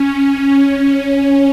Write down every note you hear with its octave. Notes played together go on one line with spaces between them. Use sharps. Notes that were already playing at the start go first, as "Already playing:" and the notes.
Already playing: C#4